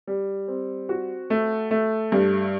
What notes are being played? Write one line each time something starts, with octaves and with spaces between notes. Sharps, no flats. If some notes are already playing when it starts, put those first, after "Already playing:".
G3
C4
F#4
A3
A3
G2